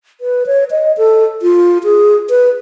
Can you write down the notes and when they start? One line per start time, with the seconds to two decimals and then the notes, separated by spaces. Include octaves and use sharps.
0.21 B4
0.47 C#5
0.71 D#5
0.98 A4
1.42 F4
1.84 G#4
2.30 B4